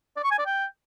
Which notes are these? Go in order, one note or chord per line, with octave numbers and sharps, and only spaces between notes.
D5
C#6
G#5
D5
G5